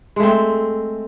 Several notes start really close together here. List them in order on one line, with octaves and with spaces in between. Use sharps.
G#3 A3 C4